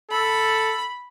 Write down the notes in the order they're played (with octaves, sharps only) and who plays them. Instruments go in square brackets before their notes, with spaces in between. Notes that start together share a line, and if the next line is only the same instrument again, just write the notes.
[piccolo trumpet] A4 [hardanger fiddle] B5